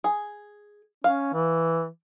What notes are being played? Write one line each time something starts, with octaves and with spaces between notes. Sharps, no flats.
G#4
C#4 F5
E3